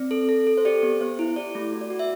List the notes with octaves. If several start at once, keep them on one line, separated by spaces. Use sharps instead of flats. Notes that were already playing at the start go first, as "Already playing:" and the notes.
Already playing: C4 D5
A4
A4
A4
C5
G4 D5
B3
B3 C5
E4
G4 D5
A3
F#4
D5
F#4
E5